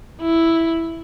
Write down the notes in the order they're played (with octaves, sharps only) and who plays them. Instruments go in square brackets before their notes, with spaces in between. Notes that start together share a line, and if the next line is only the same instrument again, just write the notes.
[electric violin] E4